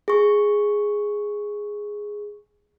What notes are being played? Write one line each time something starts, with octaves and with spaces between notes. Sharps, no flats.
G#4 C#6